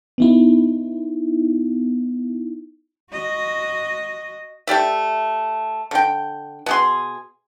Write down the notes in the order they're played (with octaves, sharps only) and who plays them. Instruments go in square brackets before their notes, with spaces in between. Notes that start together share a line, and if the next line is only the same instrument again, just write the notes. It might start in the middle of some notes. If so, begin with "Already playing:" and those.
[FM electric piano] B3 D#4 E4
[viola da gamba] F#4 D#5
[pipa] A3 G4 D5 E5
D3 G5
B2 G#4 C6